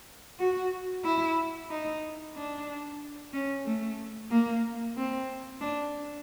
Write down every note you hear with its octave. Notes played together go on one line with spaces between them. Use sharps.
F#4
E4
D#4
D4
C#4
A3
A#3
C4
D4